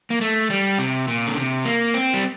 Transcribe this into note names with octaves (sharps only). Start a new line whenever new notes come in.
A#3
A3
G3
C3
A#2
D3
C3
A#3
C4
G3